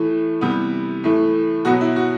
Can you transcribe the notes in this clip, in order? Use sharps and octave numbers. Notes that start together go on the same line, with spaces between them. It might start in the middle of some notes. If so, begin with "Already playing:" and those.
Already playing: A2 E3 A3
C3 E3 G3 B3
A2 E3 A3
B2 F#3 B3 F#4
E4
F#4